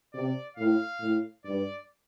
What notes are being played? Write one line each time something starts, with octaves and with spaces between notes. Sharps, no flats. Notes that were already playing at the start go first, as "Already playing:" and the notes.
C3 D5
A2 F5
A2
G2 D5